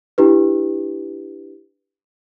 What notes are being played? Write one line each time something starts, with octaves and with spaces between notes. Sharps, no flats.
D4 E4 G4 B4